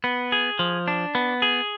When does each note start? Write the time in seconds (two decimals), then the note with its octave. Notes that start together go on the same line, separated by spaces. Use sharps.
0.04 B3
0.32 G#4
0.59 F3
0.88 D4
1.15 B3
1.42 G#4